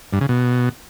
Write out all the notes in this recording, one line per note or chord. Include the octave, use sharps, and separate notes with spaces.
G2
C#3
B2